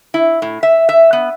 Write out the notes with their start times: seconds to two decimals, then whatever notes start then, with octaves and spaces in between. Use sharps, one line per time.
0.14 E4
0.42 A2
0.63 E5
0.89 E5
1.13 B3